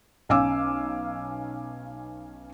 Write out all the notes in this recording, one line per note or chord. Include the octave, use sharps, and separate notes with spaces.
B1 C#4 F5 G#5 D6 E6